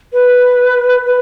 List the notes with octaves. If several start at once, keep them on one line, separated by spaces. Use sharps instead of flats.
B4
B4